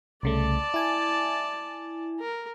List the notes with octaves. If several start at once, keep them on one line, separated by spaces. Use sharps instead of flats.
C2 C#3 A3 D5 A5
E4 G#5
A#4